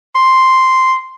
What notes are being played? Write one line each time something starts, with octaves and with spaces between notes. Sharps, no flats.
C6